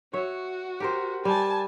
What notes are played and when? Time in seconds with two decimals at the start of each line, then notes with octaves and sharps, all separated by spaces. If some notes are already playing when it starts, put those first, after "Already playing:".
0.13 F#4 C#5 E5
0.80 G4 A#4 C5
1.25 G3 G#5 A5